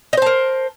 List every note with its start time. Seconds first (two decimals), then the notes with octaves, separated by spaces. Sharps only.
0.13 D#5
0.17 C5
0.22 A5
0.26 A#4